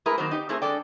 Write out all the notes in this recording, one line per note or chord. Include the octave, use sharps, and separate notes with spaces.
G#3 A3 E4 G#4 A#4 B4
D#3 F#3 A#3 C4 F#4 C5
D#4 G4
A3 C4 E4 G#4 A#4 C5
G#3 A3 D4 A4 D5 G5